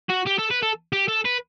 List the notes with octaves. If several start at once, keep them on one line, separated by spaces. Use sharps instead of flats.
F#4
G4
A4
B4
A4
G4
A4
B4